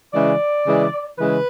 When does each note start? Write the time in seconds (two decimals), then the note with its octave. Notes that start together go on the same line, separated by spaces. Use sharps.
0.13 C#3 E3 G#3 D5
0.66 C#3 E3 G#3
1.19 C#3 E3 G#3 B4